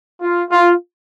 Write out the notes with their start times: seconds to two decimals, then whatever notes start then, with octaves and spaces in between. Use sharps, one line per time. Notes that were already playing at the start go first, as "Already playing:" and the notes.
0.22 F4
0.51 F4